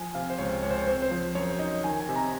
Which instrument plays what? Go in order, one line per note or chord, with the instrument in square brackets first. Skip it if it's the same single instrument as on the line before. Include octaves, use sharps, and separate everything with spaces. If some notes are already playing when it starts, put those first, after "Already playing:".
Already playing: [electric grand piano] F3 G#5
C3 F5
C5
C#2 C#5
C#2 C#5
C5
C#5
C4 C5
C5
F3
F#2 C#5
D#4 D#5
D#3 G#5
G#5
C3
A#5